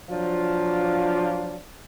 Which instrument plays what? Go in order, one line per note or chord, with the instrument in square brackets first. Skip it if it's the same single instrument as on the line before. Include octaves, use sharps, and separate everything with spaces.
[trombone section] F3 F#3 D4 F4